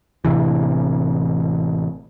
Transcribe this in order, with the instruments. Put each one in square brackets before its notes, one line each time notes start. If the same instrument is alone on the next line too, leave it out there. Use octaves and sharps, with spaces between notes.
[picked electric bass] A1 A2 C3 E3